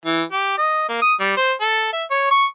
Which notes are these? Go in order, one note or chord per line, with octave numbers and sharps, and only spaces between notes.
E3
G4
D#5
A#3
D#6
G3
C5
A4
E5
C#5
C#6